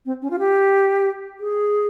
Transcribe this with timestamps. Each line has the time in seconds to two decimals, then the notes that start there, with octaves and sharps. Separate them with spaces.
0.06 C4
0.22 C#4
0.30 F4
0.39 G4
1.40 G#4